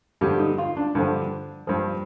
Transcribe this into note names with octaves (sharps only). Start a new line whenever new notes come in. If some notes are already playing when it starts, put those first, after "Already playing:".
G2 D3 F3 G4
D#4
F4
D4
G2 D3 F3
G2 F3